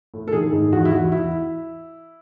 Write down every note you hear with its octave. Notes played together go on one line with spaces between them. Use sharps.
A2
A4
D#3 G#4
G#2
E2 F#4
E4
E2 F#4
E2 E4